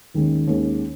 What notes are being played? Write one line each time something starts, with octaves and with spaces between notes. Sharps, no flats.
D#2 D#3 G#3 C#4
D#2 D#3 G#3 C#4